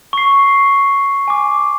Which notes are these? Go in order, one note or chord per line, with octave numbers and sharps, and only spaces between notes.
C#6 C7
G#5 D6